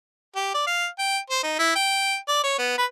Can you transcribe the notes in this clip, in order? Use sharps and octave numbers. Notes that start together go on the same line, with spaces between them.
G4
D5
F5
G5
C5
D#4
E4
G5
D5
C#5
B3
B4